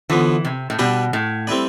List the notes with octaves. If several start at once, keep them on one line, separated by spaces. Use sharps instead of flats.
D3 E3 F3 B3
C3
A2
B2 G3 D4 G4 B4 D5
A2
G3 C4 E4 B4 D5